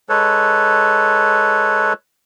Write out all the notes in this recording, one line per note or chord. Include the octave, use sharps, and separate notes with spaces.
G#3 A4 B4 C#5